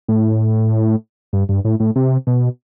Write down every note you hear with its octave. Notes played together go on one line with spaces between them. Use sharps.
A2
G2
G2
A2
A2
C3
B2